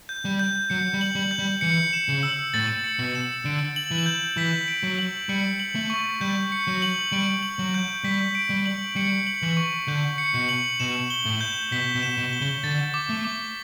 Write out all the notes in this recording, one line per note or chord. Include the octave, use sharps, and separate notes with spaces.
G6
G3
G6
F#3 C#7
G3
F#7
G3
G6
G3
E3 C#7
E7
C#3
E6
A2 A6
C#7
B2
E7
D3 D7
F#7
E3
G6
E3 B6
D7
F#3
F#7
G3 C#7
F#7
A3
C#6
G3 G6
C#7
F#3
F#7
G3 D7
F#7
F#3
G6
G3 B6
D7
G3
F#7
G3 C#7
F#7
E3
C#6
D3 G6
C#7
B2
F#7
B2 E7
G7
A2
G6
B2 B6
B2
E7
B2
G7
C#3
D3 A6
D6
A3
D6